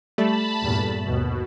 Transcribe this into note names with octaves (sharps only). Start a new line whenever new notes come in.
G3 A3 A5 B5
E2 G2 A#2
G1 D#2 B2